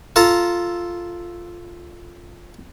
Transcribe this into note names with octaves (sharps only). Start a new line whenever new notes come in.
F4 A4 A#5